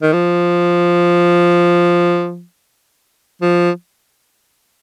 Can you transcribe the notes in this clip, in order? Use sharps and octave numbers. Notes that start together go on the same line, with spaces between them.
D#3
F3
F3